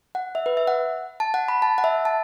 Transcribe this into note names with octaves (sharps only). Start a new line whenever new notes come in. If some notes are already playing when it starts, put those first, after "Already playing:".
F#5
E5
B4
E5
F#5
A5
F#5
B5
A5
F#5
E5
A5